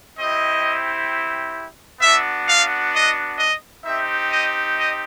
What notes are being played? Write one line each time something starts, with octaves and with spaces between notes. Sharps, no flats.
C4 E4 G4 D#5
B3 D4 F#4 E5
F5
D#5
D#5
C4 D#4 G4 E5
D#5
D#5